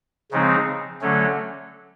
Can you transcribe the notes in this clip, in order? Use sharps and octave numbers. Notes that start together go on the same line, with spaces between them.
C#3 F3 G#3 C4 D#4
D3 F#3 A3 C#4